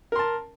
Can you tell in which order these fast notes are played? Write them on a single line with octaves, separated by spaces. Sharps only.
A#4 C6 A5